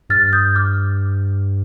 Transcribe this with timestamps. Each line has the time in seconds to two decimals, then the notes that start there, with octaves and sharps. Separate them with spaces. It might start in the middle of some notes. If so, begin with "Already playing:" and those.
0.09 G2 F6 A6
0.33 D#6 G6
0.55 D6 F6